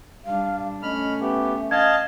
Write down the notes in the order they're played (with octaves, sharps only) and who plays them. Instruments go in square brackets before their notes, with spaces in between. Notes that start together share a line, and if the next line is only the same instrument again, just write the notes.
[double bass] G3 D4 [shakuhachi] F5
[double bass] A3 C#4 [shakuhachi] D#5 [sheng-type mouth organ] B5 F6
[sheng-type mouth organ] B3 G4 [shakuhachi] E5
[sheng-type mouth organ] D#5 F5 A5 [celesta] G#6